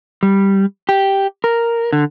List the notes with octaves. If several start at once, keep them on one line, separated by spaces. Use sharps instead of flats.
G3
G4
A#4
D3